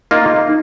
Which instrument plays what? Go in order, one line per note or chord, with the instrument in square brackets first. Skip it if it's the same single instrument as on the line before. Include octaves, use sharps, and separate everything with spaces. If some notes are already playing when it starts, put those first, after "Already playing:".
[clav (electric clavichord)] A#3 F4 [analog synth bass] D#4